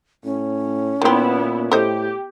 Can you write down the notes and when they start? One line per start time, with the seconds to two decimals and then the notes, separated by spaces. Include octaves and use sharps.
0.24 A2 C#4
1.02 A#2 D#3 B3 C4 E4
1.72 A2 G4 A4 C5 D#5